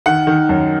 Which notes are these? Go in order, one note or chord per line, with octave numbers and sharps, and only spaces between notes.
D#3 F#5
D#3
F#2